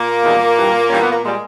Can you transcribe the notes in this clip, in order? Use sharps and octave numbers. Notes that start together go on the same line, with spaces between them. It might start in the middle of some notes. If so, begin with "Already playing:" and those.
Already playing: A#2 A#3
E2 D#3 G3
G2 E3 G3
G2 E3 G3 C#4
B3
A#3
A#2 G3 G#3